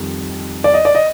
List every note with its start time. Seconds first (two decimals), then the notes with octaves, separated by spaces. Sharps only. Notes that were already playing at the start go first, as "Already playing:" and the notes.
Already playing: F2 D#3 G3
0.64 D5
0.74 D#5
0.85 D5
0.95 D#5